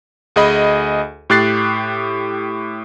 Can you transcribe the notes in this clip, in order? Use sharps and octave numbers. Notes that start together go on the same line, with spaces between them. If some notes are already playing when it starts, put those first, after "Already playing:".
D2 G#4 D#5 B5
A2 G4 F#6 A6 C7